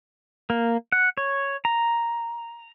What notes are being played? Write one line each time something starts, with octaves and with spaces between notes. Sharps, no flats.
A#3
F#5
C#5
A#5